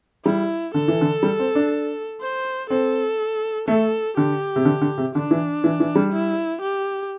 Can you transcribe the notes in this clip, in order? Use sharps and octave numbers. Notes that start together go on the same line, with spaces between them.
G3 E4
D3 A4
E3
D3
G3
C4
D4
C5
C4 A4
A3 A4
D3 G4
C3
D3
D3
C3
D3 D4
E3
E3
E3
G3
E4
G4